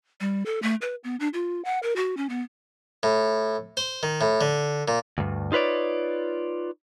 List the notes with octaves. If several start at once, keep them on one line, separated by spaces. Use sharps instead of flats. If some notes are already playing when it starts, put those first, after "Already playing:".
G3
A4
A3
B4
B3
D4
F4
F#5
A#4
F#4
C#4
B3
A2
C5
D#3
A2
D3
A#2
D2 G2
D#4 F4 B4 C#5 D5